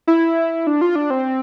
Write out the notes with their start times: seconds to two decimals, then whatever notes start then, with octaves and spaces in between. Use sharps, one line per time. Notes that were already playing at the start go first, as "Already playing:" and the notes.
0.07 E4
0.67 D4
0.81 F4
0.95 D4
1.10 C4